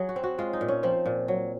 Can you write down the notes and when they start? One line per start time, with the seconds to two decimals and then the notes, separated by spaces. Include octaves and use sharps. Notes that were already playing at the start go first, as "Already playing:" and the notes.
Already playing: F#3 G#4
0.09 F#4
0.16 C4
0.24 F#4
0.38 G#3 F4
0.53 D#4
0.61 A#2
0.68 C#4
0.83 F3 C4
1.06 A#2
1.28 F#3